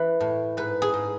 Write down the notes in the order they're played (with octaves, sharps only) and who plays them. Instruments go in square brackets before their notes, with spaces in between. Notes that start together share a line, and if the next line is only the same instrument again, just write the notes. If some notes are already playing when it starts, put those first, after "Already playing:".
Already playing: [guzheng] E3 B4
A2
G#2 B4
G#4
G#2